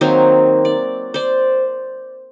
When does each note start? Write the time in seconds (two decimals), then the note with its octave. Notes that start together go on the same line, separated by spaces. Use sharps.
0.01 D#3 F#3 A#3 C4
0.65 D5
1.14 C5 D5